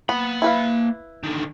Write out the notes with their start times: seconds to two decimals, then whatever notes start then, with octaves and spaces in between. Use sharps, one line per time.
0.09 A#3 B3 B5
0.42 E4 B4 F5
1.23 D3 D#3